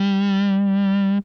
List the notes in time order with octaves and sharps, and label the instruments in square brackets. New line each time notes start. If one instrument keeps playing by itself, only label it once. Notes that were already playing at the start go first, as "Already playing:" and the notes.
Already playing: [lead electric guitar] G3